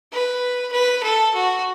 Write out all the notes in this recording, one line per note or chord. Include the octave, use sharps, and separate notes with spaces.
B4
B4
A4
F#4